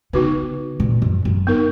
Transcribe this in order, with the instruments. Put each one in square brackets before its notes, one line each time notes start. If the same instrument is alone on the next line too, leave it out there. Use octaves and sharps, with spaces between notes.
[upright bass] C#3 [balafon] B3 D#4 F#4 B4
[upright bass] A#2
F#2
F#2
[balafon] B3 D#4 A#4